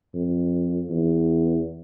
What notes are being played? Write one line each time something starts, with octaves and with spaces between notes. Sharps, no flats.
F2
E2